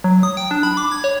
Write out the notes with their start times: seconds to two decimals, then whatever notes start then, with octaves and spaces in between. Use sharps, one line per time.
0.04 F#3
0.23 D#6
0.37 G5
0.51 D4
0.63 B5
0.77 D6
0.92 G#6
1.04 C#5